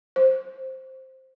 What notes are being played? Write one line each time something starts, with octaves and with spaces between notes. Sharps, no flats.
C5